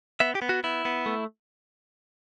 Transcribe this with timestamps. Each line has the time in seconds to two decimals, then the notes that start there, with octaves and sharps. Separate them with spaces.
0.20 B3 E5
0.35 G4
0.42 B3
0.49 F#4
0.64 B3 E4
0.85 B3
1.06 A3